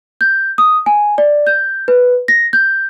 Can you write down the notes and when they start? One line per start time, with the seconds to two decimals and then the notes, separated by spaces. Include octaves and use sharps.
0.21 G6
0.58 D#6
0.86 G#5
1.18 D5
1.47 G6
1.88 B4
2.28 A#6
2.53 G6